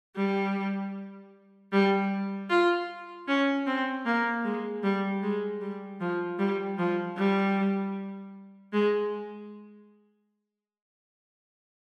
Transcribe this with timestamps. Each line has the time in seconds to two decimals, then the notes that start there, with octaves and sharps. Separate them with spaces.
0.16 G3
1.73 G3
2.50 F4
3.28 C#4
3.66 C4
4.06 A#3
4.44 G#3
4.83 G3
5.22 G#3
5.61 G3
6.01 F3
6.39 G3
6.78 F3
7.17 G3
8.73 G#3